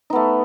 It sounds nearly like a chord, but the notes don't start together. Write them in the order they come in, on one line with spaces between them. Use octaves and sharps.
D#4 B3 A3